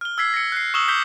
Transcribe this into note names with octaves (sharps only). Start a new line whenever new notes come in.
F6 G7
E6 G#6 B6 C7
A#6 C#7
F#6 C7
C#6 D#6 E6 E7 F#7 G7
D6 G6 B6 G7